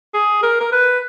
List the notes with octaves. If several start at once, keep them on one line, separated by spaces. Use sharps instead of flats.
G#4
A#4
A#4
B4